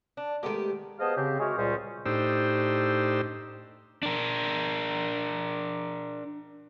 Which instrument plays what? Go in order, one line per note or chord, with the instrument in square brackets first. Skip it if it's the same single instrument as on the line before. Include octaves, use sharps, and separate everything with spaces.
[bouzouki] D4
[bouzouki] D#3 G4 [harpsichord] G#3 A3 B3
[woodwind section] B3 G#4 C5 D#5 F5 A5
C#3 C4 G4
G#3 F#4 G#4 A#4 C#5 E5
C#2 A#2 G3 C#4 C5 D5
[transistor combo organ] A2 D4 D#4 G4 C5 E6
[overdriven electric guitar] D4 A#4